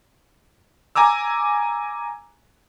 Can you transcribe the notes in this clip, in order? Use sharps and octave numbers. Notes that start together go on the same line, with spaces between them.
G#5 A#5 D6 E6